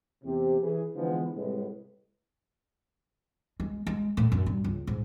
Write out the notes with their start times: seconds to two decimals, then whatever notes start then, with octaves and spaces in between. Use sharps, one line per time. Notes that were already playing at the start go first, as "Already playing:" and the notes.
0.24 E2 C3 C4 G4
0.61 E3 G#4
0.96 D3 E3 F3 G#3 B3
1.35 C2 A2 G#3 B3
3.60 G#3
3.87 G#3
4.17 A2
4.32 F#2
4.46 G2
4.64 C#2
4.87 G#2